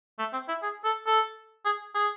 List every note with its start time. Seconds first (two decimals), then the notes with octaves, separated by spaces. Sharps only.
0.19 A3
0.33 C4
0.48 E4
0.62 G#4
0.84 A4
1.06 A4
1.65 G#4
1.95 G#4